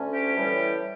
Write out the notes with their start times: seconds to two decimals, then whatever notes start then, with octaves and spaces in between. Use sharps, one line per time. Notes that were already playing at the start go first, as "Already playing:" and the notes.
Already playing: D2 D3 A3 C#4
0.14 G4
0.37 A2 E3 G3